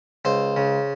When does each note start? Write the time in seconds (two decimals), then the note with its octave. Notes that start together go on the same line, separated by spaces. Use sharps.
0.25 C#2 C5
0.57 C#3